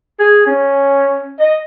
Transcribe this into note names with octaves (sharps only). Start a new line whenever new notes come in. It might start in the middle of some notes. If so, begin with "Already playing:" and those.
G#4
C#4
D#5